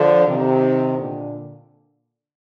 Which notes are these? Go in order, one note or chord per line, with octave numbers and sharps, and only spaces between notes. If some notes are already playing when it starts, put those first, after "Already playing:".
Already playing: D3 F3
C3 D#3
A#2 D3